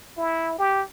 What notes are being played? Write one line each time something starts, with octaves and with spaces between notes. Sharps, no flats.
E4
G4